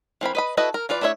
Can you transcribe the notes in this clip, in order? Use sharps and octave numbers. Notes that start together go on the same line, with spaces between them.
E3 C4 A#4 B5
B4 D#5 B5
E4 F#4 A4 B4 D#5
A#4
E3 F4 B4 D5
A3 D4 E4 C#5 E5